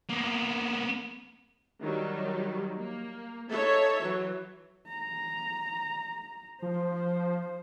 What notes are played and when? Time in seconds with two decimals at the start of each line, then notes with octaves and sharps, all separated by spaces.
0.10 A#3 B3
1.81 D#3 F#3 G3
2.77 A#3
3.50 D#4 A4 C#5 E5
4.01 E3 F#3
4.87 A#5
6.62 F3 C5